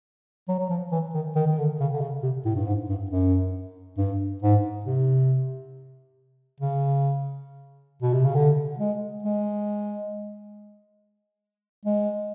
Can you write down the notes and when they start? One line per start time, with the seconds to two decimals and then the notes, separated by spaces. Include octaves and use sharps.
0.48 F#3
0.59 F#3
0.69 F3
0.92 E3
1.14 D#3
1.35 D#3
1.46 D#3
1.58 D3
1.80 C#3
1.93 D3
2.01 C#3
2.23 C3
2.45 A2
2.56 G2
2.66 G#2
2.89 G2
3.10 F#2
3.97 G2
4.42 G#2
4.85 C3
6.60 C#3
8.02 B2
8.13 C3
8.24 C#3
8.35 D3
8.79 G#3
9.22 G#3
11.85 G#3